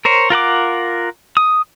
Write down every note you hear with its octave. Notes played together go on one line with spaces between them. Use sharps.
A#4 C5 C#5
F4 A#4 F#5 D6
D#6